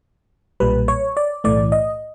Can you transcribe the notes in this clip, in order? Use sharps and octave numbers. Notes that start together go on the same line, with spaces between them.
B1 A#2 G3 B4
C#5
D5
B1 A2 E3 A3 D5
D#5